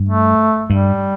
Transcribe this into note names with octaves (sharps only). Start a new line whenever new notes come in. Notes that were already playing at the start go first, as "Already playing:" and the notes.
Already playing: G2
A3
G2 G3